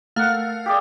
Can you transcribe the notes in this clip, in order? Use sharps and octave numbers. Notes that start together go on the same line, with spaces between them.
A3 A#4 F5 F#5
G4 G#4 D5